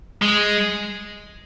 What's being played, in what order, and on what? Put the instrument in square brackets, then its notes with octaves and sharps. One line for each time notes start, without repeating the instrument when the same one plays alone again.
[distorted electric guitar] G#3